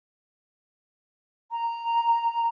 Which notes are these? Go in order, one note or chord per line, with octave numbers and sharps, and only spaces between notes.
A#5